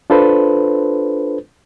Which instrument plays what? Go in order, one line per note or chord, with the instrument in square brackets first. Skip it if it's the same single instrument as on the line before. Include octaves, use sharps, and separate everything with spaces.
[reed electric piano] D4 F4 A4 B4 C5